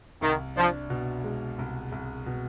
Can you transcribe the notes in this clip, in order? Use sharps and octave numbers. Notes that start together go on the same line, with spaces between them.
C2 D#3
F3 D4
B2
G#3
C2
C2
B2